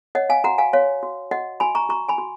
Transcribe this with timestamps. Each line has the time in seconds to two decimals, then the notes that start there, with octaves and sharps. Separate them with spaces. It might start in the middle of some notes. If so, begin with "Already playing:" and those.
0.15 C#5 D#5 F#5
0.29 F5 G#5
0.44 F#4 F#5 A#5
0.58 F5 G#5
0.73 F#4 C#5 F5
1.03 F#4
1.31 F#4 D#5 F#5
1.60 F#4 G#5 B5
1.75 A#5 C#6
1.89 F#4 A#5 C#6
2.09 G#5 B5
2.18 F#4